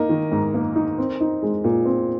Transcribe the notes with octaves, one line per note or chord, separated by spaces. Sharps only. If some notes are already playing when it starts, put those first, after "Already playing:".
Already playing: A#3 D#4 A#4 D#5
D#3
G#2
A#3
D#4
C4
D#4
G#3
A#2
C4